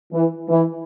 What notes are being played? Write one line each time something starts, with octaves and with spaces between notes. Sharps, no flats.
E3
E3